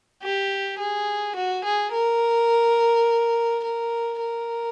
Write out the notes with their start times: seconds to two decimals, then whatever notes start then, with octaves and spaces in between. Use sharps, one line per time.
0.23 G4
0.79 G#4
1.36 F#4
1.64 G#4
1.93 A#4
3.64 A#4
4.21 A#4